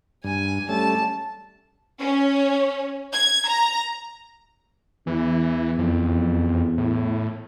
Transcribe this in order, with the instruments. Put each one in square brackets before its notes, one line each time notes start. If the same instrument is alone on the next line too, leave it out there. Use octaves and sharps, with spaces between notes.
[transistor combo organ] G2 [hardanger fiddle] G#5
[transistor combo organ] G3 A3 C#4 [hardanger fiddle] A5
[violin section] C#4
G#6
A#5
[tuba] E2 [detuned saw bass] E3
[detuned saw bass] F2
A2